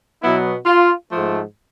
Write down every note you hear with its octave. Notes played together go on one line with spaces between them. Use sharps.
B2 F#3 B3 E4
F4
G#2 F3 A3